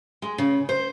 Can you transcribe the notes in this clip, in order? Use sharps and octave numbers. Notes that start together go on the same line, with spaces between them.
G#3
C#3
C5